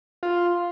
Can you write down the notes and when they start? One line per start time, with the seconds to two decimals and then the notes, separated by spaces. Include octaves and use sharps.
0.23 F4